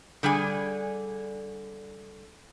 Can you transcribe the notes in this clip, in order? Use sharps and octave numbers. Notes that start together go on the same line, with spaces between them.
D3 G3 G#4 G#5